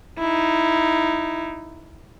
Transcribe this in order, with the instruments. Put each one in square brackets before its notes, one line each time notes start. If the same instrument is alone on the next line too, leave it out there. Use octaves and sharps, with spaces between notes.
[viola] D#4 E4